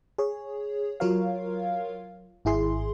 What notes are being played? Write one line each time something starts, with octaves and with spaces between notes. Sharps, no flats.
G#4 C#5
F#3 F4 A#4 C#5 F5
G#1 E4 G#4 C6